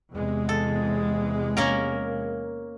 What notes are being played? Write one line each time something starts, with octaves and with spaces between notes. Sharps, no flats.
E2 C3 G#3
A4
A#3 C#4 A#4